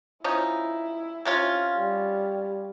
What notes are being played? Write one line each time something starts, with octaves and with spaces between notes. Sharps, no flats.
F3 C#4 D#4 E4
C3 C#4 F4
G3